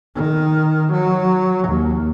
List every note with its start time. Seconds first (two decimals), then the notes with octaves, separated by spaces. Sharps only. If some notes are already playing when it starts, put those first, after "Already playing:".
0.15 D#3
0.92 F#3
1.68 D#2